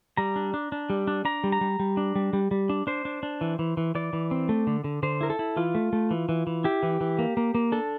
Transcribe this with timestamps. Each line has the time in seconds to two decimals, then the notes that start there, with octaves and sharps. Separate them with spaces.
0.17 G3 A#5
0.36 D4
0.54 D4
0.72 D4
0.90 G3
1.08 D4
1.25 D4 A#5
1.44 G3
1.52 A#5
1.61 G3
1.80 G3
1.97 D4
2.16 G3
2.33 G3
2.51 G3
2.69 D4
2.87 D4 C5
3.05 D4
3.23 D4
3.41 E3
3.59 E3
3.77 E3
3.95 E3 D5
4.13 E3
4.31 C4
4.49 A3
4.67 D3
4.84 D3
5.03 D3 C5
5.21 E4 A#4
5.30 A4
5.39 E4
5.57 E3 F4
5.75 A3
5.93 A3
6.11 E3
6.29 E3
6.47 E3
6.64 E4 G4
6.83 E3
7.01 E3
7.19 A#3
7.37 A#3
7.55 A#3
7.72 D4 A4